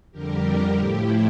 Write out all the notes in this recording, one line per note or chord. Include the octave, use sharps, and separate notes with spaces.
F2 D3 G3 G4 A#4
A2 F3 A3 E4 G4